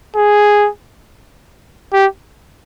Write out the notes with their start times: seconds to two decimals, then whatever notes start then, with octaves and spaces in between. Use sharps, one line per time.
0.16 G#4
1.93 G4